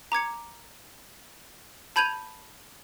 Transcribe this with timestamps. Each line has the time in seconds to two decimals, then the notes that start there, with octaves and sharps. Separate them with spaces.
0.12 A#5 D6 G#6 C#7
1.96 A5 B5 G6 G#6 D#7 F7